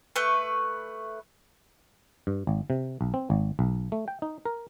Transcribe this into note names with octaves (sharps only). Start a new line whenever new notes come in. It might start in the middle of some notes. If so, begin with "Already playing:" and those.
A3 B4
G2
G#1
C3
B1
C4
G#1
B1
A3
G5
D#4
A#4